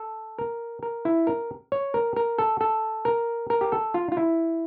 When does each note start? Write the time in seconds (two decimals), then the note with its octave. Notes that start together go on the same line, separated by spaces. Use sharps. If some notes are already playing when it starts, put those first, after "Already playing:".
Already playing: A4
0.39 A#4
0.83 A#4
1.05 E4
1.27 A#4
1.72 C#5
1.94 A#4
2.16 A#4
2.38 A4
2.61 A4
3.05 A#4
3.50 A#4
3.61 G4
3.72 A4
3.94 F4
4.12 F4
4.17 E4